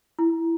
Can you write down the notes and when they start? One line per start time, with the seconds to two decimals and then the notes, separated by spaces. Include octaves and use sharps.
0.19 E4